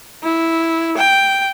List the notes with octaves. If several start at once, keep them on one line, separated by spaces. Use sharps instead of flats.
E4
G5